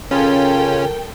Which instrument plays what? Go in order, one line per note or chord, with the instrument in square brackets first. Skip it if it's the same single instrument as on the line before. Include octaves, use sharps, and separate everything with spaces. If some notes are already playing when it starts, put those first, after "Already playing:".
[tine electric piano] C#3 F4 [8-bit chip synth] C#4 [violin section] A4 G5 [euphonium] A#4